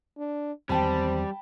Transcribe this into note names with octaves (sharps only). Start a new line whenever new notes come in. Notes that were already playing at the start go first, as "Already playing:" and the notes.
D4
E2 D#3 F#3 G3 C4 G5 A5 B5